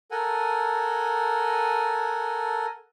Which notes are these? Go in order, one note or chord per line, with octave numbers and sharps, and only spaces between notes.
A4 A#4 F#5 G#5